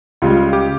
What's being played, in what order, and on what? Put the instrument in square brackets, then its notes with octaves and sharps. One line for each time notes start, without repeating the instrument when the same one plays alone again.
[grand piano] C#2 C#3 G3 [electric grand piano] F4
[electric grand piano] G4